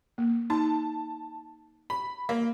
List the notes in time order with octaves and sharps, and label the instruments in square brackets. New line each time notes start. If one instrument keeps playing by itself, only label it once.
[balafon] A#3
[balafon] D#4 [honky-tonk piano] A5
[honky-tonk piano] B5
A#3